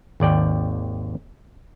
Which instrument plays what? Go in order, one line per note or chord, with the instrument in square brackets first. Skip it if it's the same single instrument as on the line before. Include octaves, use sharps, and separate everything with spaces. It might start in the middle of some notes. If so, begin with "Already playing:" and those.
[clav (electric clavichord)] G#1 D#2 D5 G5